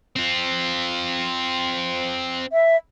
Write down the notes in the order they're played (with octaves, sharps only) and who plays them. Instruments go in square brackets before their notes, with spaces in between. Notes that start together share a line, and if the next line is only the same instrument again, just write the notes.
[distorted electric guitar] C4 F4
[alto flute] E5